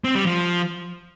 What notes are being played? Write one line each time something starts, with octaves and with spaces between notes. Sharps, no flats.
C4
G3
F3